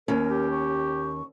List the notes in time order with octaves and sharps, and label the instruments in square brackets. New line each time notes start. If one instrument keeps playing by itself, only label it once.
[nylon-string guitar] D#2 C#4 [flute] A#4
[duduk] G4
[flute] C#6